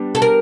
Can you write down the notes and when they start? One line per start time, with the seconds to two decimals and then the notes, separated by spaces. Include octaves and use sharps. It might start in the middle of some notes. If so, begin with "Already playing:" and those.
Already playing: G3 B3 D4
0.15 A4
0.22 A#4